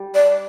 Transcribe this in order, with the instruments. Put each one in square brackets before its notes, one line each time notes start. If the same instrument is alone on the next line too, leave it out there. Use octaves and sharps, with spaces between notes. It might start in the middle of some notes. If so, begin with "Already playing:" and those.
Already playing: [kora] G3
[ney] D5